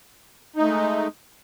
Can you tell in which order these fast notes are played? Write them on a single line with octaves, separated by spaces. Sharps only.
D#4 A3 G#3